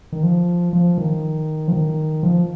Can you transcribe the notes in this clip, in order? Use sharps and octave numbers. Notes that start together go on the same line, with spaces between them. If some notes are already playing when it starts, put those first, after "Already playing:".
D#3
F3
F3
D#3
F3
D#3
F3